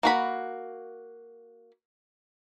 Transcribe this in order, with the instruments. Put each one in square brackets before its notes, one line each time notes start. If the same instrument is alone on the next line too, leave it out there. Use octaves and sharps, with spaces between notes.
[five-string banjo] A#3 F#4 B5